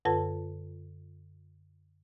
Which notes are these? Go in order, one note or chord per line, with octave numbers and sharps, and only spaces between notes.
F#2 D3 F4 A4 B4 A5